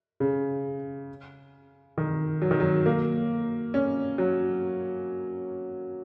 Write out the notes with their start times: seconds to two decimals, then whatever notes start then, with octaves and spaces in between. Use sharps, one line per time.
0.20 C#3
1.98 D#3
2.42 F#3
2.51 D#3
2.60 F#3
2.86 A#3
3.74 C#4
4.18 F#3